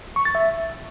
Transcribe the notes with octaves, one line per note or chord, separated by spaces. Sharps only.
C#6
A6
E5